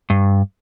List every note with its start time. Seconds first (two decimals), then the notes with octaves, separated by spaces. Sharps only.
0.10 G2